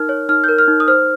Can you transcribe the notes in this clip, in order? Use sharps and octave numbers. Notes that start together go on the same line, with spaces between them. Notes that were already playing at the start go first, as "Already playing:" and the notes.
Already playing: D#4 A#4 F6
C#5
D#4 F6
G6
A#4
F6
D#4
D#6
C5 F6